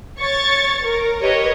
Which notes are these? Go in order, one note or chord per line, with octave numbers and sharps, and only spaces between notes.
C#5 C#6 A6
A#4
G4 A#4 B4 C#5 D#5